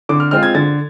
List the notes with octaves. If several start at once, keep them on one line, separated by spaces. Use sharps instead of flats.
D3 D6
F6
G#3 C4 F4 F6
G#6
D3 A6